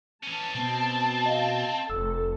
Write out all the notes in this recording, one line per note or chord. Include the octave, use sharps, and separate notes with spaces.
E3 C#4 A5
B2 C4
D#5 F5
F1 A4 E6